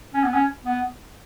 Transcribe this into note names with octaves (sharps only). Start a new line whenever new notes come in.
C#4
B3
C#4
B3